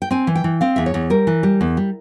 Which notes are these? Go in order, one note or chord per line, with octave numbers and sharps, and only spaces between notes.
G5
C4 G#5
E3
G5
E3
C4 F5
E2 E5
C#5
E2
G3 A#4
E3
G3
E2
G3